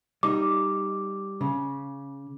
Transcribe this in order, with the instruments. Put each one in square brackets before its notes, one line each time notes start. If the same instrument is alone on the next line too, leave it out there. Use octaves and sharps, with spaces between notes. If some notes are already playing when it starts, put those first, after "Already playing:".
[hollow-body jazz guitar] G3 D#4 [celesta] D6
[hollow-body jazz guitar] C#3